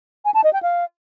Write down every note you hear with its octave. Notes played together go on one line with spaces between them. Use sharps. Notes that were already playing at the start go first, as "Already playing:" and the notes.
G#5
A5
D#5
G5
F5